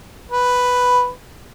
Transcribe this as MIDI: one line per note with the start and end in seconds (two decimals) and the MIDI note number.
0.32 1.10 71